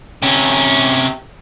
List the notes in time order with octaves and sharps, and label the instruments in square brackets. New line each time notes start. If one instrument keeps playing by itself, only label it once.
[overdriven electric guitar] C3 C#4